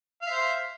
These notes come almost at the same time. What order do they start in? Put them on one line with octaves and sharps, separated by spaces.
F5 E5 C5